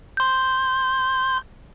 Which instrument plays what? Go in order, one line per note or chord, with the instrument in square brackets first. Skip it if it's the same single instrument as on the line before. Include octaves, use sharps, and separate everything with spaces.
[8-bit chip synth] C6 G6